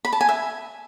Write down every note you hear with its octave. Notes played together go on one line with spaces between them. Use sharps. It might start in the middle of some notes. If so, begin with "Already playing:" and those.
B5
A5
G#5
E5